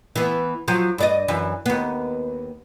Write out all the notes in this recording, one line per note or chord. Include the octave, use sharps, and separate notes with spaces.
E3 B3
F3 F#3
G2 D5 D#5
F#2 E3
D#2 B3